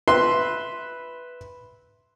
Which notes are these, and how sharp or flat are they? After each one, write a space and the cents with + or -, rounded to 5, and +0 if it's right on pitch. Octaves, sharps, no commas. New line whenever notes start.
B4 +0 E5 -5 C6 +0